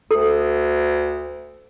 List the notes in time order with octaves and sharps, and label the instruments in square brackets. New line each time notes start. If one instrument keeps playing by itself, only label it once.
[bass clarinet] D2 [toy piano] A4